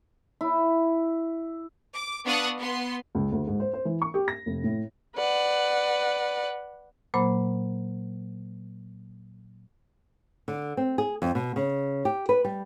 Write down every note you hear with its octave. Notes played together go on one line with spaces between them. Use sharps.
E4
D6
B3 D4 F5 C#6 D#6 F#6
B3 C6
C#2
D2
G#2
C5
C5
E3
C#6
G4
A#6
F1
A2
B4 D5 F#5
A#2 F#3 A#3 C5 B5
D3
C4
G#4
F2
B2
C#3
G4
B4
G3